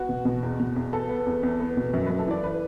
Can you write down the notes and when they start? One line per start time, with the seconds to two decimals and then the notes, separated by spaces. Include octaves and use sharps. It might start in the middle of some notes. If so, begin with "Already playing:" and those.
Already playing: B3 F#4
0.09 B2
0.25 B2
0.43 E2
0.60 B2
0.76 E2
0.93 B3 A4
1.09 B3
1.26 E2
1.43 E2
1.60 B3
1.77 B2
1.94 F#2
2.06 B4
2.11 F#2
2.19 A4
2.27 E3 D5
2.44 B4